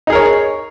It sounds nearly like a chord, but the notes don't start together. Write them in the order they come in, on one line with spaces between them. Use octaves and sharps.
D#4 G#4 A#4 C#5